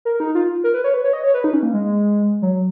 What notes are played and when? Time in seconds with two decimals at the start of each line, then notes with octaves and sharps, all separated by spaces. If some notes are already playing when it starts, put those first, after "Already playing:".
0.05 A#4
0.20 D#4
0.35 F4
0.64 A#4
0.74 B4
0.84 C#5
0.94 B4
1.04 C#5
1.13 D#5
1.24 C#5
1.34 B4
1.44 D#4
1.53 C#4
1.63 A#3
1.74 G#3
2.42 F#3